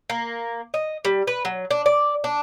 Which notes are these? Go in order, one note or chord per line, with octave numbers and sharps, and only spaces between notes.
A#3
D#5
G3
B4
F#3
D4
D5
D4